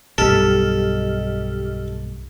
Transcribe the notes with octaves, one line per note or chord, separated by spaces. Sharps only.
B1 G2 G4 A4 D#5 F6